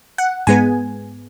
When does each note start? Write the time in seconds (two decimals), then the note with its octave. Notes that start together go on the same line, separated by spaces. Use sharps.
0.18 F#5
0.47 G#2 G#3 B3 G#5